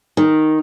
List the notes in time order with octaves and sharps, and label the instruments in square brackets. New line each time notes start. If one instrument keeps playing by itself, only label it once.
[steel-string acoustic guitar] D#3